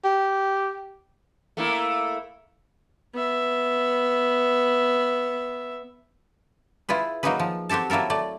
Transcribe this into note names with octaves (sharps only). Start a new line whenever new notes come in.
G4
A3 A#3 E4
B3 E5
E4 F4 G#4 B4
F#3 A#3 D#4 F#4 G#4 B4
F3
C4 F#4 G4 A4 A5
F#3 A#3 E4 A4 A#4
A3 D5